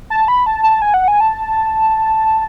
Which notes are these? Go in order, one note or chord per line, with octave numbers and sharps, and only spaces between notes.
A5
B5
A5
A5
G#5
F#5
G#5
A5